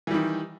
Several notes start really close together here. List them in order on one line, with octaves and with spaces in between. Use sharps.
E3 G3 D#3